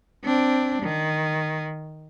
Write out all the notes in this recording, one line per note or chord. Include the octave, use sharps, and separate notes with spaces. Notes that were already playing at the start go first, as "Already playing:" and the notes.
C4 D4
D#3